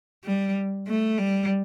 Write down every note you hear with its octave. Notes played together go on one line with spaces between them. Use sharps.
G3
A3
G3